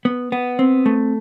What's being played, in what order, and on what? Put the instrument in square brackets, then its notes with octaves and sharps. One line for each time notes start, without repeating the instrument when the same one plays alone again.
[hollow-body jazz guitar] B3
B3
C4
A3